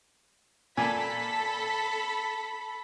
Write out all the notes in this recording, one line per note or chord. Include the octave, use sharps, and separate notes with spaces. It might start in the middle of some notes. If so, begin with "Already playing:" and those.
A#2 A4 G#5 B5 B6